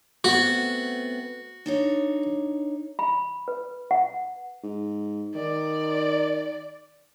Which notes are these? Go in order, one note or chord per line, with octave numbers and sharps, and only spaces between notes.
A3 B3 C4 F#4
D4 D#4 C#5
B5
B4
F#5
G#2
D#3 D5